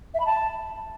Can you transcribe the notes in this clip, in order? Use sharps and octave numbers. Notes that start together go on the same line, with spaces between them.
E5
B5
A5